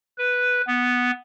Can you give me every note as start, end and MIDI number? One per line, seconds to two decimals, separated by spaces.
0.18 0.62 71
0.67 1.11 59